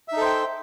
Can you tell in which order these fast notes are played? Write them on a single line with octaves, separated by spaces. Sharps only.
E5 D#4 A4 C5 G5